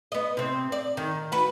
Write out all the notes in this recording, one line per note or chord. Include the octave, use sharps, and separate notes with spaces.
B3 D#5
C3 C4
D5
D#3
F#4 B4